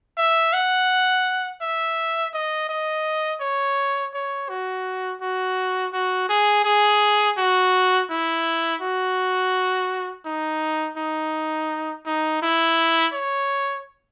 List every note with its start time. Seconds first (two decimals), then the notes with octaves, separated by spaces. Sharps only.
0.18 E5
0.53 F#5
1.61 E5
2.34 D#5
2.69 D#5
3.41 C#5
4.14 C#5
4.49 F#4
5.22 F#4
5.93 F#4
6.29 G#4
6.65 G#4
7.37 F#4
8.10 E4
8.81 F#4
10.26 D#4
10.97 D#4
12.06 D#4
12.42 E4
13.13 C#5